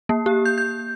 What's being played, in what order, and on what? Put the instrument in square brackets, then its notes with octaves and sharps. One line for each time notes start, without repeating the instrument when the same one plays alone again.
[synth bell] A#3
G4
G6
G6